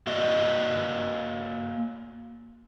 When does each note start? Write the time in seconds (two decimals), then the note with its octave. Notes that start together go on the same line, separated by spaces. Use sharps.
0.07 A#3 F#4 D5 D#5